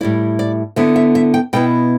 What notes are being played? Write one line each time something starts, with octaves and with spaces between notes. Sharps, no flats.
A2 G3 E4 D5
D5
D3 B3 E4 E5
E5
E5
G5
B2 B3 E4 G5